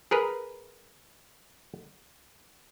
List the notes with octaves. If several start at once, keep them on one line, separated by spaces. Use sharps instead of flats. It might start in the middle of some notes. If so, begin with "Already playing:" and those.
G#4 A#4 B4